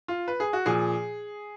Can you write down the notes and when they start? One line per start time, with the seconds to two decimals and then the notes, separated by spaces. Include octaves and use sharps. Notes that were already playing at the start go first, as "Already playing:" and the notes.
0.08 F4
0.28 B4
0.40 G#4
0.53 F#4
0.66 A#2 F3 G#4